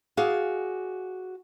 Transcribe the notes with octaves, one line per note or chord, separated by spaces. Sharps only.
F#4 G#4 D5 F5